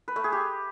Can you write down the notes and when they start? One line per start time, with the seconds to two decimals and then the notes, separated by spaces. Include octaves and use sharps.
0.08 B4
0.16 A3
0.24 G#4
0.32 G4